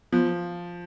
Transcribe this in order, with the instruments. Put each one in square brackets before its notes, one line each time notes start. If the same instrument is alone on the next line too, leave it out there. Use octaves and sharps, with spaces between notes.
[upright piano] F3 [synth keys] B3